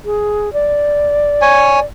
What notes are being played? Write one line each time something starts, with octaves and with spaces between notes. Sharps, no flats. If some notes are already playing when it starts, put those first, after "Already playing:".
G#4
D5
C#5 G#5